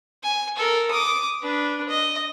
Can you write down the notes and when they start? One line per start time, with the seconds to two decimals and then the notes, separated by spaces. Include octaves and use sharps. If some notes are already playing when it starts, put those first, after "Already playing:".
0.23 G#5
0.56 A4 A#4
0.90 D6 D#6
1.42 D4 B4
1.88 D#5